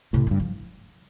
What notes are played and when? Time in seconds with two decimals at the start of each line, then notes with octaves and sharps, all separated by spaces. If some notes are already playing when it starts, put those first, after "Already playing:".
0.13 A2 C3
0.27 D3
0.31 G2
0.40 F3